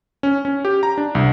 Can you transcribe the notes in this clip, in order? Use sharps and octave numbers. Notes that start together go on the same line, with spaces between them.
C#4
C#4
G4
A#5
D4
C2